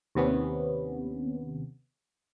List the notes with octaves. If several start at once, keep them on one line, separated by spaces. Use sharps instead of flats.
D#2 C3 B3 C#4